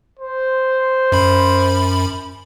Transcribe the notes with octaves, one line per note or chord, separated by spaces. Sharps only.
C5
F#2 B5